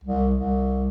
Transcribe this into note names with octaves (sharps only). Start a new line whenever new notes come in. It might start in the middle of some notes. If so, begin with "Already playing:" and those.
C2
C2